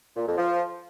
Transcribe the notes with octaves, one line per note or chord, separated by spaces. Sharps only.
A#2
F2
F3